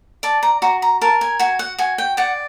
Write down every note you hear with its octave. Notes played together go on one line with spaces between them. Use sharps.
D5 A5
A#5
F#4 A#5
A#5
A#4 A5
G#5
F#4 G#5
F#5
F#4 G#5
G5
D5 F#5